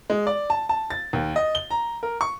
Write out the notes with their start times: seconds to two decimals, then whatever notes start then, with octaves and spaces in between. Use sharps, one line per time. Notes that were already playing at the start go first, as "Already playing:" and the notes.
0.10 G#3
0.27 D5
0.50 A5
0.69 A5
0.90 A6
1.13 D#2
1.36 D#5
1.55 G7
1.71 A#5
2.03 A#4
2.21 C#6